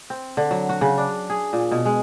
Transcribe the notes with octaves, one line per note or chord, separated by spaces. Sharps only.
C4
D3
F#3
F#4
C#3
D4
G#4
A#2
B2
G#3